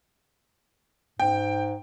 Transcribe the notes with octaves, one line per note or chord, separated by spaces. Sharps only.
G#2 G5